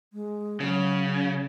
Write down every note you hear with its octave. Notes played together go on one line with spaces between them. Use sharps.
G#3
C#3 F#3